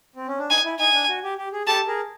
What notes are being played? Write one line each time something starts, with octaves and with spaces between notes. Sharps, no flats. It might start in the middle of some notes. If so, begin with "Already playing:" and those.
C4
C#4
D4
D#4 G#5
E4
D#4 G#5
D4
F#4
G4
G4
G#4
G4 A4 A5
G#4 A#4